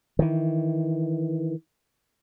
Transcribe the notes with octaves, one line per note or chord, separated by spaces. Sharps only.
D#3 E3